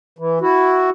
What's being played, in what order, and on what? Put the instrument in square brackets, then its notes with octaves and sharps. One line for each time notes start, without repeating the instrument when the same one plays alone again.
[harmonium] E3
E4 F#4